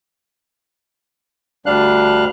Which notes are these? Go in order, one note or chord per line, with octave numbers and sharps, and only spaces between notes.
D2 G3 D4 F5 F#6